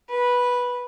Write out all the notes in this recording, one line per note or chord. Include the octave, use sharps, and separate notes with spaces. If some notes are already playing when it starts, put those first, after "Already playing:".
B4